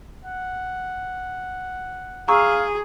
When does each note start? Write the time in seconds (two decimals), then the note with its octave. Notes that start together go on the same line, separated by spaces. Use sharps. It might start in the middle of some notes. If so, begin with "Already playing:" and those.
0.25 F#5
2.28 G#4 F5 A#5 C#6 E6